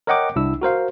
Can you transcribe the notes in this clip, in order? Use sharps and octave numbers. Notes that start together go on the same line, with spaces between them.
A#4 C#5 D#5 F#5 G5 D6
C2 D4 E4 E6
F#4 A#4 C5 F5